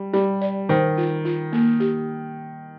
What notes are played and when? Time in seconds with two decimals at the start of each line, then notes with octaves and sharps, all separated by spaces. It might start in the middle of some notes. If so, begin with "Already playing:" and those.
Already playing: G3
0.13 G3 G4
0.42 D5
0.69 D#3 C5
0.98 F4
1.25 F4
1.53 A#3
1.80 G4